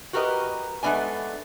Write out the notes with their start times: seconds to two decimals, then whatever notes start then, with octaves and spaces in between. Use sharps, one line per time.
0.13 F#4 G4 A#4 B4 D#5
0.83 G#3 A3 B3 D4 G#5